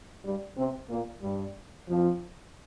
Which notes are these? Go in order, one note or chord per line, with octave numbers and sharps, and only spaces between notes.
G2 G3
C3 C4
A#2 A#3
G2 G3
F2 F3